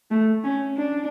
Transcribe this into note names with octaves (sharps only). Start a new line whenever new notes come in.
A3
C#4
D4